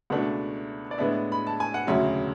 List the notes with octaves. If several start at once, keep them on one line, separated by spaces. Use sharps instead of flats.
C#2 B2 A3 D4 F#5
D5
A2 G#3 B3 D4 E5
B5
A5
G#5
F#5
E1 D2 C#3 F#3 E5